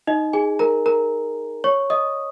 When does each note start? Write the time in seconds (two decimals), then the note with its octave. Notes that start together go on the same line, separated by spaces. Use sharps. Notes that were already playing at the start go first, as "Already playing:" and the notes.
0.07 D#4 D#5
0.33 G#4 G#5
0.59 A#4 A#5
0.86 A#4 A#5
1.64 C#5 C#6
1.90 D#5 D#6